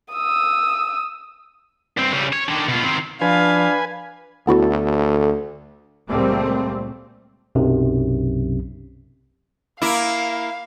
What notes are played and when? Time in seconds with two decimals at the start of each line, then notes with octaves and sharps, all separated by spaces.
0.14 D#6 E6
1.97 G2 C4
2.13 C#3 G3
2.33 C#5
2.48 D3 D#3
2.68 B2 F4
2.83 D#3 C4
3.21 F3 D4 B4 F5 G#5
4.47 D2 B3 E4 F#4 A4
6.09 C#2 A#2 G3 A3 A#3 C4
7.55 B1 F#2 C3
9.82 A#3 E4 F5